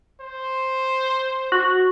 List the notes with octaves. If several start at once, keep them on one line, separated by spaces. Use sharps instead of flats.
C5
F#4